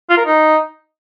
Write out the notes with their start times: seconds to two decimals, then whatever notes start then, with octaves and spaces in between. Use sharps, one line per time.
0.10 F4
0.18 A#4
0.26 D#4